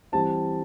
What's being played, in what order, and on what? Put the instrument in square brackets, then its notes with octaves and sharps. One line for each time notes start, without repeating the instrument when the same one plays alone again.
[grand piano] E3 G3 C4 A5